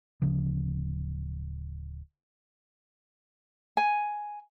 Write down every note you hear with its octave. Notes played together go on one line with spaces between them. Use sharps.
D1 C#3 F3
G#5